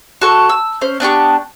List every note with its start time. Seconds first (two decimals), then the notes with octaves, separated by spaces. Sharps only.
0.21 F#4 A4 C#6
0.49 E6
0.81 C#4 C5
1.00 B3 D4 G4 C#6